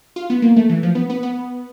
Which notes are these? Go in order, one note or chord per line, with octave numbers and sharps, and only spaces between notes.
F4
B3
A#3
A3
E3
F3
B3
B3
B3